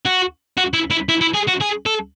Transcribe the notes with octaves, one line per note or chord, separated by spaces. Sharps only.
F#4
F#4
E4
E4
E4
E4
G#4
F#4
G#4
A4